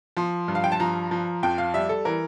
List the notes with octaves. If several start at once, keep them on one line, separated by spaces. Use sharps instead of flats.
F3 C6
G2
F5
G5
A5
F3 A#5
F3
F2 G5
F5
G3 E5
A4
E3 A#4